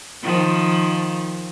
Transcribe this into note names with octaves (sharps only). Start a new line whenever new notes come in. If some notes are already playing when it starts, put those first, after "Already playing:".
D#3 F3